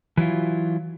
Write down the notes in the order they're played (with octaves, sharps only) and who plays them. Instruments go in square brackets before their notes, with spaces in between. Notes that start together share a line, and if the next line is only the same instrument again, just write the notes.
[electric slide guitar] E3 F#3 E4 F4